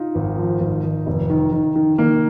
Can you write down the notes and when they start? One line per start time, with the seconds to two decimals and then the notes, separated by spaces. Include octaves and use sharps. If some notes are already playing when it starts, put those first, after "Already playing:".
Already playing: D#4 F4
0.15 G#1
0.38 F3
0.60 G#1
0.84 G#1
1.06 F1
1.30 D#3
1.53 D#3
1.76 D#3
1.98 D#3 A#3